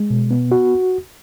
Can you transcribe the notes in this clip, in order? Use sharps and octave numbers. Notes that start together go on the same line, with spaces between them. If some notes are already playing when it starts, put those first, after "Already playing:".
Already playing: G#3
B2
B3
F#4